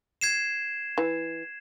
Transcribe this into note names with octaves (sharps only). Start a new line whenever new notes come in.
G#6 C7 E7
E3